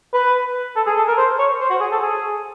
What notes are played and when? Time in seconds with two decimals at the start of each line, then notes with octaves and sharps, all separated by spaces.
0.14 B4
0.76 A4
0.86 G#4
0.97 A4
1.08 A#4
1.18 C5
1.39 C#5
1.60 C5
1.70 F#4
1.80 G#4
1.92 A4
2.01 G#4